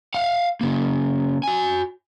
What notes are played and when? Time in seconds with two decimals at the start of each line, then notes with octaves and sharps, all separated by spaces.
0.14 F5 F#5
0.61 C#3 A#3
1.44 F#4 G#5